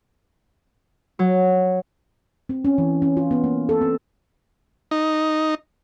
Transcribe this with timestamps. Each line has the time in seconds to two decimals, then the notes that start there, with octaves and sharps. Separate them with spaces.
1.19 F#3
2.49 C4
2.65 C#4
2.78 E3
3.02 C#4
3.17 F4
3.31 B3
3.44 A#3
3.69 A4
3.81 C4
4.91 D#4